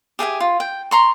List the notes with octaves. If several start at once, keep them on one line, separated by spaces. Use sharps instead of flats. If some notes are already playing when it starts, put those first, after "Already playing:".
G4 G#4 E5 G#5
F4
G5
A#5 C6 C#6